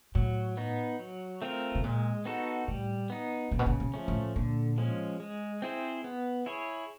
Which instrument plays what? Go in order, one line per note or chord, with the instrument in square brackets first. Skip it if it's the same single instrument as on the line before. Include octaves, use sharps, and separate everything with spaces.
[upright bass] A2 [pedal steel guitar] F#3
[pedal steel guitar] B3 D#4
F#3
A3 C4 F4 A#4
[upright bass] B2
[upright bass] A#2 [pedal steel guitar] G#3
[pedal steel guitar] B3 D#4 F#4 A4
[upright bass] A2 [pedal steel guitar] G3
[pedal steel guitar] B3 D#4
[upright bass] A#2 [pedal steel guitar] C#3
[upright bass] B2
A#2
B2
[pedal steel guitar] F3 A3 C#4
[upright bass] A2
[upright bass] A#2 [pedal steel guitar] D3
[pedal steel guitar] F3 G#3 C#4
G#3
C4 E4 G#4 C5
B3
E4 G#4 C#5